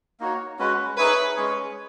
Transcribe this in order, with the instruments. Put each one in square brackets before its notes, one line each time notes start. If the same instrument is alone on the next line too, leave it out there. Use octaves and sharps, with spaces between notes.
[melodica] A#3 D#4 F#4 C#5
G#3 C#4 F#4 B4
[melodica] D#4 G#4 C#5 E5 [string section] B4
[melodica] G#3 C#4 G#4 C#5